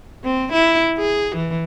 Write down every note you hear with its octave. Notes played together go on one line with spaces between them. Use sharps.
C4
E4
G#4
E3